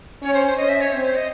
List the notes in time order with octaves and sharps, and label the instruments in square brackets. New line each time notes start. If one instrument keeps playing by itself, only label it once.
[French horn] C#4 [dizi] C#5
[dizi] C5
C5
[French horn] C#4 [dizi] D#5
[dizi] E5
C#5
[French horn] C4 [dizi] C5
[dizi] C5
D#5